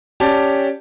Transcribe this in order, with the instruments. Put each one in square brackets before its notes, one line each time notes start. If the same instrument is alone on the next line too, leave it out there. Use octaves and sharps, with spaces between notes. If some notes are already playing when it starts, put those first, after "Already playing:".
[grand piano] C#4 G4 D5 A5